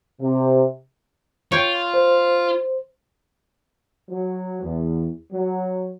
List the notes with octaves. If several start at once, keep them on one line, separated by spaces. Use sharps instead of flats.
C3
F4 C#5 G5
C5
F#3
E2
F#3